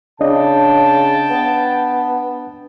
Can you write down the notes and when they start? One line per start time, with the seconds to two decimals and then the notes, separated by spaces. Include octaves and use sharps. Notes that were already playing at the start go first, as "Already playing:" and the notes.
0.21 C#3 D4 D#5 G5 A5
1.30 B3